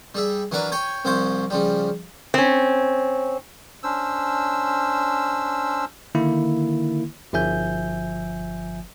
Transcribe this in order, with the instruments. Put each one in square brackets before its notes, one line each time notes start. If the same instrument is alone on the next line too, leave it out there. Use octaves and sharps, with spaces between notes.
[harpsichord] G3 G#4 E5
E3 F#3 D4 A#4 B4
C#5 G5 G#5 C#6
C2 F3 C5 C#5
C#3 F3 G3
[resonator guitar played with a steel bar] C4 C#4
[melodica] C#4 D4 C5 E6
[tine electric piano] D3 D#3 A#3 E4
G1 F3 E5 G#5 G6